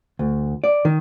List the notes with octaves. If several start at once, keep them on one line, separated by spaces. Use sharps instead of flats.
D2
D5
D#3